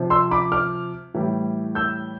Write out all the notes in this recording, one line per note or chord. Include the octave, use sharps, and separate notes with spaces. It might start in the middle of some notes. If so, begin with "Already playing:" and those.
Already playing: C3 F3
C6 E6
B5 D6
D6 F6
A2 E3 G3
E6 G6